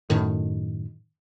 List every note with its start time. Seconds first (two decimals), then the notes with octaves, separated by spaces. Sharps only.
0.10 F#2 A2 D#3